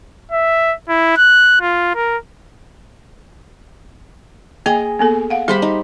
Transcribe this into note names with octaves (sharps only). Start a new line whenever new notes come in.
E5
E4
F#6
F4
A#4
A#3 G#4 D#5 G5
A#3 B3 A4
F5 F#5
G3 G4 G#4 C5 B5
D#4